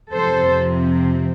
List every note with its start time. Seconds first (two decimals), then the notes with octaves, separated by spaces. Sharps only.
0.13 F2 C3 F3 C4 A4 C5